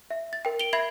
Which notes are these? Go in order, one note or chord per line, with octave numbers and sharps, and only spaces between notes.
E5
A6
A#4 G5
D7 F7 G7
E5 B5 G#6 C7 F#7